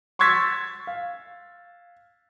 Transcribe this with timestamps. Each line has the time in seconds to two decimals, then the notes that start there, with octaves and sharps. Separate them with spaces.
0.19 C6 C#6 E6 G#6 A6 B6
0.87 F5